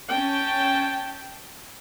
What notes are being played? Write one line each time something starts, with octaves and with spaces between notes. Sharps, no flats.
C#4 G5 A5